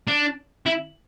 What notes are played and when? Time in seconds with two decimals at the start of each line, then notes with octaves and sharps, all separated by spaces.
0.08 D4
0.66 E4